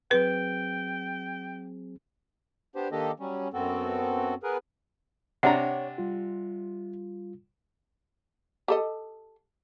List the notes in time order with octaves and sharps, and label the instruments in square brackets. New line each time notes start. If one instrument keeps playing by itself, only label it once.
[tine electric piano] F#3 C4 G#4 [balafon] B4 [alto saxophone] G5
[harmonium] B3 D4 G4 C5
D#3 A#3 D4 G4 A4 D#5
F#3 G3 C#4
F#2 B3 C4 F#4 A4
B3 G#4 A#4 B4
[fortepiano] C3 D4 A#5 [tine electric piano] C#5 [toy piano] F#5
[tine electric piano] G3 F4
[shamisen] G4 A4 D#5